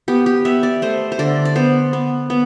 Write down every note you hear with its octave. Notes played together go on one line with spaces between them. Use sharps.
B3 G4
G4
B3 E5
D5
A3 C5
C5
D3 D5
D5
B3 C5
B3
B3